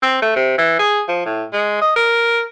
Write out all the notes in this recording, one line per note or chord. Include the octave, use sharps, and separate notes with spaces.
C4
A3
C3
E3
G#4
F3
A2
G#3
D#5
A#4